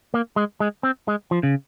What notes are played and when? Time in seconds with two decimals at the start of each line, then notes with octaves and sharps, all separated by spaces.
0.14 A#3
0.36 G#3
0.60 G#3
0.83 C4
1.08 G#3
1.31 F3
1.43 C#3